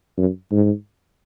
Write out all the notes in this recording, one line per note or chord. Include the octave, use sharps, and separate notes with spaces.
F#2
G#2